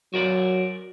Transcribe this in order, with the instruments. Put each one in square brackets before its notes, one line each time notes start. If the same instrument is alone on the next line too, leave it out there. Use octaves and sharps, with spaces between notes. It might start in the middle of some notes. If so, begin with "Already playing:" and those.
[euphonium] F#3 [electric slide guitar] F#4 A#4 D5